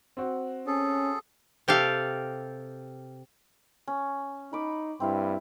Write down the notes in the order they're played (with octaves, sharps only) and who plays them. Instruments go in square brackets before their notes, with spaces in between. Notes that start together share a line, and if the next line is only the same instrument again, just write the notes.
[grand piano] C4 F#4
[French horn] C#4 [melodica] G#4 A4
[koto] C3 G4 A4 F5
[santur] C#4
[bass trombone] D#4 [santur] B5 D6
[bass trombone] G2 [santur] C4 E4 F5